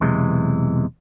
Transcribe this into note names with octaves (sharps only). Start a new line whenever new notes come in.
B1 E2 C3 E3 G#3